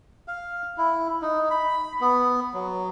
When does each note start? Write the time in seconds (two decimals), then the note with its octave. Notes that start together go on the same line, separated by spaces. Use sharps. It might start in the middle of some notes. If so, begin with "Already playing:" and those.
0.28 F5
0.78 E4
1.22 D#4
1.50 B5
2.01 B3
2.54 F#3